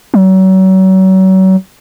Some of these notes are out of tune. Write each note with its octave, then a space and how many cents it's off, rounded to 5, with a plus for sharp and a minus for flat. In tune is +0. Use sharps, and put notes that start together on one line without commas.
F#3 +35